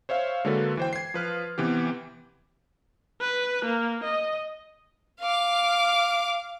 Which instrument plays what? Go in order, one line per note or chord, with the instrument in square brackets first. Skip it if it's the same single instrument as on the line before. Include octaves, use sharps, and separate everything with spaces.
[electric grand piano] C5 C#5 E5 F5
D3 G#3 A#3 F#4 A4 B4
E3 C5 G5
G#6 C7
F3 B4 F6
C3 E3 B3 G4
[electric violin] B4
A#3
D#5
[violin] F5 D6